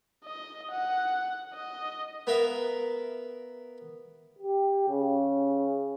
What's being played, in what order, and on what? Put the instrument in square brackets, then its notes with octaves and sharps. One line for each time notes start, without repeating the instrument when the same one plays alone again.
[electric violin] D#5
F#5
D#5
[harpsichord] B3 A#4 E5 F5
[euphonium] G4
C#3